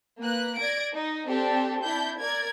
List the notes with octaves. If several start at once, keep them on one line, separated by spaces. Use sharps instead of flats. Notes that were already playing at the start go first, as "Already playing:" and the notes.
A#3 B4 F#6
D5 G#6 A#6 D7
D#4
C4 D4 G4 A4
D4 E4 G6
A#4 D5 G#6